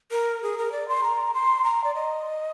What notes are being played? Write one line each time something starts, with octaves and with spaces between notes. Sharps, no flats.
A#4
G#4
A#4
D5
C6
A#5
C6
A#5
D5
D#5